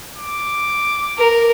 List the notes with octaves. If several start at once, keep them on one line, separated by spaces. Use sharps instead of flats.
D6
A#4